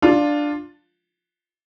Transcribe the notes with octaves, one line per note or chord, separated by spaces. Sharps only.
D4 F4